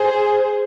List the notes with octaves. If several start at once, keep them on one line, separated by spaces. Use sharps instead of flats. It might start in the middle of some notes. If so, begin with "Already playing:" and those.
Already playing: G#4 C5